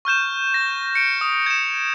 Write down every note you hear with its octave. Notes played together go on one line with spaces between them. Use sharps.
C#6 F6 G6 E7
A#6
C#7 D7
D#6
G#6 E7